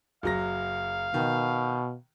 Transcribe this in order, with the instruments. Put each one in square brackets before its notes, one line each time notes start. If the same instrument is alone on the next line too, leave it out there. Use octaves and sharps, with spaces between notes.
[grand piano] F#1 F#3 A#6 [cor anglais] F5
[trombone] B2 [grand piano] D#3